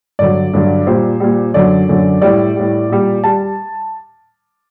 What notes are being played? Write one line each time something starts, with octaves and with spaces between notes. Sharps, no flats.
G2 D3 F#3 D5
G2 D3 F#3
A#2 G3 C5
A#2 G3
F#2 D3 F#3 D5
F#2 D3 F#3
A2 G3 D5
A2 G3
A#2 G3
G3 A5